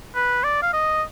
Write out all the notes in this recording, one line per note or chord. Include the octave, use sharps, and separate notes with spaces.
B4
D5
F5
D#5